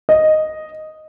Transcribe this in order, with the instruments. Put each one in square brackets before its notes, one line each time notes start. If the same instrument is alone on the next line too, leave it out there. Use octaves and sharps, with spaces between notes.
[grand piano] D#5